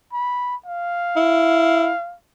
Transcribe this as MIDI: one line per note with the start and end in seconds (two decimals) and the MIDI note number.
0.13 0.56 83
0.66 2.15 77
1.16 1.91 64